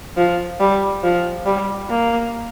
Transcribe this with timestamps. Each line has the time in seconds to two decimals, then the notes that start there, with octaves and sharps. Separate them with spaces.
0.17 F3
0.60 G3
1.03 F3
1.45 G3
1.89 A#3